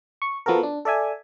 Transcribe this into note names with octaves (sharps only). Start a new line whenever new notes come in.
C#6
F3 B3 F#4 A4 A#4
D4
A4 D5 E5 G#5